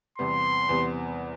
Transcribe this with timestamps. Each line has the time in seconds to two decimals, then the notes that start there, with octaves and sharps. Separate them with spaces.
0.18 E2 C3 G3 B3 C6
0.69 E2 C3 G3 B3